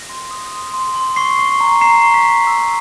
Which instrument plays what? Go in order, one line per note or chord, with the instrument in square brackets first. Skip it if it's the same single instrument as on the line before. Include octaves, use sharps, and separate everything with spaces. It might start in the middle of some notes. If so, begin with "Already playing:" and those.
Already playing: [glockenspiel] A#6
C6
D#6
C6
C6
C6
C#6 C7
C#6
A#5
A#5 C7
C#6
B6
A#5
E6